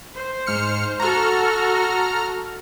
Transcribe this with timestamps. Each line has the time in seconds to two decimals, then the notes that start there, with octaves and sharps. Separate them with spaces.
0.15 C5
0.46 G#2 F6 C#7
1.00 F#4 A4 A#5 F6